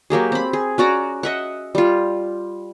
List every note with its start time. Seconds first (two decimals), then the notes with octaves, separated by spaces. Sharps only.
0.10 F#3 A#3 G4 G#4
0.32 C4 B5
0.53 G#4
0.78 C#4 F#4 D5 A#5
1.23 D#5 E5 F#5
1.75 G3 F4